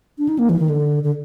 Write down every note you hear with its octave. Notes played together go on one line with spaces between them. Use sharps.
D4
D#4
A#3
E3
D#3
D3
D3